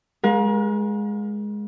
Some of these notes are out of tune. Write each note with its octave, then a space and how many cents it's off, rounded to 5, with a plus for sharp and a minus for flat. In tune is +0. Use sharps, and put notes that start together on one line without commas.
G#3 +0 A#4 +35 F5 +35